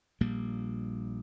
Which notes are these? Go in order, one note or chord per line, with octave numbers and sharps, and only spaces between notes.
A#1 A#2 G3 A#3